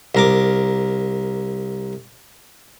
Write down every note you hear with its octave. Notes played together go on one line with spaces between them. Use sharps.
C2 A#4 D6